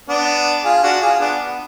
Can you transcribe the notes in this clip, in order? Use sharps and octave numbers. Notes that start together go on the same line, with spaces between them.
B3 D4
F4 G#4
D4 F#4
F4 G#4
B3 D4
B3